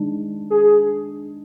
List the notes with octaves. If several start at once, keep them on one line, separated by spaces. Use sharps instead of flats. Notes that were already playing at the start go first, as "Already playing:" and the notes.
Already playing: D#3 G#3 D4
G#4